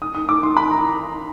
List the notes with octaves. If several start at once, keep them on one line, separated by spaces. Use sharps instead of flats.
D#6
D#6
D6
C6
B5
A#5